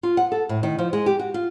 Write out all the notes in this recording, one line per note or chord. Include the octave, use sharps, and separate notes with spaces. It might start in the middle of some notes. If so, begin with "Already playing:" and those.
F4
F#5
A4
A2
D#3
F3
G#3
G4
F#4
F4